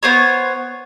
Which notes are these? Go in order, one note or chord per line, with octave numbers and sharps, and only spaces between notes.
B3 C5 C#5